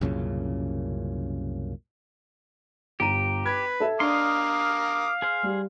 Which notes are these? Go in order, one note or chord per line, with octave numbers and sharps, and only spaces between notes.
C2 F#2 A#2 C#3
G1 G4 A#5 D#7
B4 B5 G#6
A4 E5
D4 A#4 D#5 F5 C6 D6 D#6
G#4 C5
G3